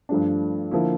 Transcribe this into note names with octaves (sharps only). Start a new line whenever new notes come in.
G2 F3 A3 D4
D3 F3 A#3 E4